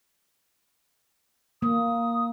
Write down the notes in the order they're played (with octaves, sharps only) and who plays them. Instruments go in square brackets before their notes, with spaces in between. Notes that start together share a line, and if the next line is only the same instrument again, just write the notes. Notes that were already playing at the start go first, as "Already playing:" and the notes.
[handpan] A#3 [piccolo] D#6